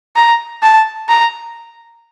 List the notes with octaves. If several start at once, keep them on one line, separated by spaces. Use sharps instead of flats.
A#5
A5
A#5